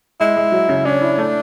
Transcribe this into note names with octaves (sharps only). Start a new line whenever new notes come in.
G#3 E4
G#3
F#3
C#3
C#4 D4
E4
A3